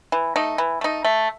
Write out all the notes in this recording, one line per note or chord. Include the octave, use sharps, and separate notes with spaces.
E3
A3 D#4
E3
A3 D#4
A3